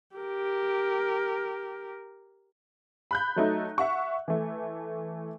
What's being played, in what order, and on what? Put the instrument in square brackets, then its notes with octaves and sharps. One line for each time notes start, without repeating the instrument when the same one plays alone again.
[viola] G4 A#4
[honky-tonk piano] B5 F#6 G6
F#3 A3 D#4
E5 F#5 C#6
E3 A3